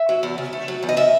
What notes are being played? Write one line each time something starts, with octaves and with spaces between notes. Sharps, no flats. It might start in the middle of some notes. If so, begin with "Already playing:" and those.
Already playing: E5
F#3
E2
C#3
A3
F#3
E2
D#5
C#3 E5